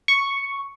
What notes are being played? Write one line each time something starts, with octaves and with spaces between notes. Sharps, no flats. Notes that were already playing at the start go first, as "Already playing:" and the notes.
C#6